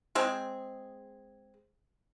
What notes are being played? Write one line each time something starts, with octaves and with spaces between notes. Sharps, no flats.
G#3 C4 G#4